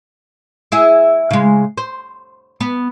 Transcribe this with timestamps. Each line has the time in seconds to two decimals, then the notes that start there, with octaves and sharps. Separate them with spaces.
0.72 E4 G#4 E5
1.30 C#3 G#3
1.77 C5
2.60 B3